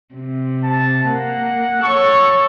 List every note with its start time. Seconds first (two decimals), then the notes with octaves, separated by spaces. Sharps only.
0.15 C3
0.64 A5
1.08 A#3 F#5
1.83 A4 C#5 C#6